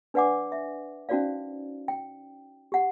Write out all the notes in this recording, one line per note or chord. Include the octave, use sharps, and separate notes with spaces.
D4 B4 D5 F#5 G#5 D6
E5
C#4 D#4 F#4 C5 D5 F5
G5
G4 F#5